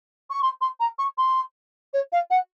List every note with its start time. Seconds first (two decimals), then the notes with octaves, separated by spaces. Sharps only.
0.30 C#6
0.42 C6
0.61 C6
0.80 A#5
0.98 C#6
1.18 C6
1.93 C#5
2.12 F5
2.30 F#5